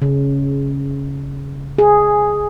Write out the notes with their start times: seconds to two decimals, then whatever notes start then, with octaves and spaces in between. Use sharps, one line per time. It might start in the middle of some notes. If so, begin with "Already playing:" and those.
0.02 C#3
1.78 G#4